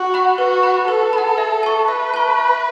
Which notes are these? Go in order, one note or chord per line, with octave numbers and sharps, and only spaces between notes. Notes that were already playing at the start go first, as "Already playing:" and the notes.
Already playing: F#4
F#5 B5
F#4 B4
F#5 B5
A4 B4
B5
F#5
E5
A5 C#6
B4 E5
A5 C#6
E5